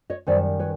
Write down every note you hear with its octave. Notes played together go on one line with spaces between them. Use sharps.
C#5 D#5
F#2 D#3 G3 C5 D5
B4 C#5